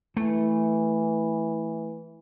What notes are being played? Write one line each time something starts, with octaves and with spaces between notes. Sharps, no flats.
E3 A3